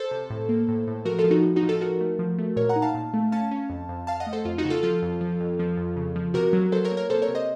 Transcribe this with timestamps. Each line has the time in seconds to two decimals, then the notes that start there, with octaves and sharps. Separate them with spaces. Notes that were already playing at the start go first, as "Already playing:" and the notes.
Already playing: A4 C5
0.11 C3
0.30 A2
0.49 A#3
0.68 A2
0.87 A2
1.05 F3 F#4 A#4
1.18 F4 A4
1.24 F3
1.31 D#4 F#4
1.43 A2
1.56 D#4 F#4
1.63 F3
1.69 F4 A4
1.81 D#4 F#4 A#4
2.00 A3
2.19 F3
2.38 A3
2.56 A#2 A#4 C#5
2.69 F#5 A#5
2.76 D#4
2.82 F5 A5
2.94 A#2
3.14 A3
3.32 C#4 F5 A5
3.51 C#4
3.70 F2
3.89 F2
4.07 F2 F5 A5
4.20 D#5 F#5
4.27 A3
4.33 A4 C5
4.45 F2 F4
4.58 D#4 F#4
4.65 C#3
4.70 F4 A4
4.83 F3 F4 A4
5.02 F2
5.21 F3
5.40 F2
5.59 F3
5.77 F2
5.96 C#3
6.16 F3
6.34 C3 F#4 A#4
6.53 F#3
6.72 F#3 A4 C5
6.85 A#4 C#5
6.92 A#3
6.97 A#4 C#5
7.10 C3 A4 C5
7.22 A#4 C#5
7.28 C3
7.35 C5 D#5